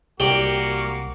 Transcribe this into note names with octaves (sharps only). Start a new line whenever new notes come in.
C2 A#3 F#4 G4 D5